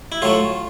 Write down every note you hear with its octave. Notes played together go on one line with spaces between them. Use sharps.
E4
A2 F#3 A3 F4